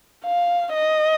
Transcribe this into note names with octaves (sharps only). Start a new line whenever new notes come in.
F5
D#5